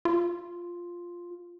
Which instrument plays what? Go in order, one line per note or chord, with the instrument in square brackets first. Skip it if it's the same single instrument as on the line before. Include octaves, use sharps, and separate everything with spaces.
[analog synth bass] F4